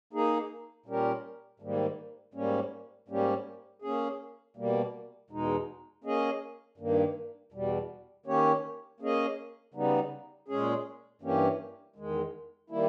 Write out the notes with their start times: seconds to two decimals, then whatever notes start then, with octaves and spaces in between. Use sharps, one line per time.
0.13 A#3 D#4 G#4
0.86 A#2 G3 C#4 G4 A#4
1.60 G#2 D#3 G3 A#3
2.34 G#2 G3 A#3 C#4
3.08 G#2 G3 A#3 C#4 G4
3.82 A#3 C#4 G#4
4.57 B2 G3 A#3
5.30 E2 B2 G#3 D#4
6.04 A#3 C#4 G#4 D#5
6.78 G2 D#3 A#3
7.52 E2 B2 G3
8.26 D#3 A#3 C#4 G4 C#5
9.00 A#3 C#4 G#4 D#5
9.74 C#3 G3 B3 D#4
10.48 A#2 G#3 C#4 G#4
11.22 G2 E3 A#3 C#4 G4
11.96 E2 D#3 G#3
12.70 D#3 G3 A#3 E4